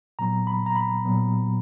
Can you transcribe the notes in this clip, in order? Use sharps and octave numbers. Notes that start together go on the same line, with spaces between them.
A#2 F#3 B3 A#5
B5
A#5
B5
A#2 F#3 B3